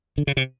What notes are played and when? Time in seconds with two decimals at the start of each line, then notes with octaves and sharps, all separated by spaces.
0.18 D3
0.27 C#3
0.37 C3